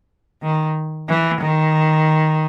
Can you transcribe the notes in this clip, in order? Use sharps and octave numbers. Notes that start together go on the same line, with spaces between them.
D#3
E3
D#3